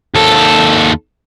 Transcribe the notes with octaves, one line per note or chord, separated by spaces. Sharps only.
D#2 A4